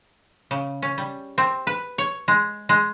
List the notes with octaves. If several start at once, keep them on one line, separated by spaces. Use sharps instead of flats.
C#3
C#4
G3
C4
B4
C#5
G#3
G#3